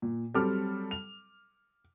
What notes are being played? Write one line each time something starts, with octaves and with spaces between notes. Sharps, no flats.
A#2
F#3 G3 C4 A4 D6 F6
F7